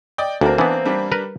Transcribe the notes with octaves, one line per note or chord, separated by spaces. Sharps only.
D5 D#5 G5
D2 A#3 C4 D4 A#4
E3 B3 D4
G3 D4 G4
A#4 B4